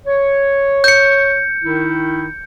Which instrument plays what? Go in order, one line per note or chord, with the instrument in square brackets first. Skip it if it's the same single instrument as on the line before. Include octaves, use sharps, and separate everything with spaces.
[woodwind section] C#5
[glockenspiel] G6 C#7
[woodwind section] D#3 D#4 E4